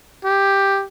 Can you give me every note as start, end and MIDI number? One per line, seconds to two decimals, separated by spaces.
0.25 0.85 67